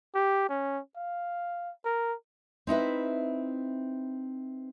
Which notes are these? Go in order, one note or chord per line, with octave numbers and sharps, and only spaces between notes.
G4
C#4
F5
A#4
C4 D#4 E4 B4